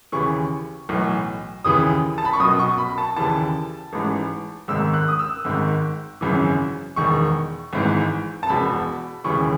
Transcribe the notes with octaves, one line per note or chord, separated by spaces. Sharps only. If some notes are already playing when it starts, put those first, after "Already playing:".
D#2 C#3 E3 C#6
B1 A2 E3
D#2 C#3 E3 D#6
A5
B5
C#6
B1 B2 D#6
C#6
B5
A5
D#2 C#3 E3 A5
A1 G#2 E3
G#1 G#2 D#3 E6
F#6
D#6
E6
G#1 G#2 D#3
G#1 F#2 C#3 E3
E1 E2 D#3 C#6
G#1 G#2 E3
A5
E1 E2 B2 B5
E1 D#2 C#3 E3 C#6